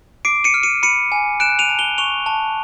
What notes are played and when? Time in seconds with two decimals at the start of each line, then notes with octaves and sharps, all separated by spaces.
0.25 D6 C7 D7
0.44 C#7 D#7
0.54 F6
0.63 C#7 D#7
0.83 B5 C#7 D#7
1.12 G#5
1.40 F#6 D7 E7
1.59 D#7 F7
1.69 A5
1.79 F7 G7
1.98 C#6 F7 G7
2.26 A5